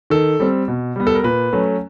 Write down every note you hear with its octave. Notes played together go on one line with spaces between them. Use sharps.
D#3 A4
G3 C4
B2
G3 B3
A4
A#4
A#2 B4
F#3 A3 C#4